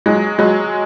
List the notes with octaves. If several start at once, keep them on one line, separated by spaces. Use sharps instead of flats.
F#3 G#3
F#3 G#3